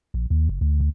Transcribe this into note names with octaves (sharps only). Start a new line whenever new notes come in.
A#1
D#2
F#1
D2
D2